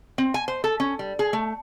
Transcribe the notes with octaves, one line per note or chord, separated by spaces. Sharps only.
C4
G#5
C5
A4
C#4
G3
G#4
A3